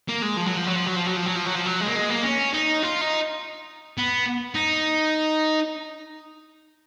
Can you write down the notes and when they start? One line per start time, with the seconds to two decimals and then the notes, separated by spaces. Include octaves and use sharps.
0.08 A#3
0.22 G#3
0.37 F3
0.46 F#3
0.57 F3
0.67 F#3
0.76 F3
0.86 F#3
0.96 F3
1.07 F#3
1.17 F3
1.26 F#3
1.36 F3
1.46 F#3
1.56 F3
1.66 F#3
1.81 G#3
1.88 A#3
1.96 G#3
2.10 A#3
2.24 C#4
2.53 D#4
2.82 F4
3.01 D#4
3.98 B3
4.55 D#4